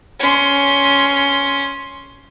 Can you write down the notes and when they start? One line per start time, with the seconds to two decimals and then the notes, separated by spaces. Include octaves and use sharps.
0.19 C#4 C6